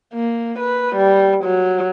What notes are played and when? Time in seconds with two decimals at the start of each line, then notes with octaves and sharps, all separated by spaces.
0.14 A#3
0.59 B4
0.95 G3
1.44 F#3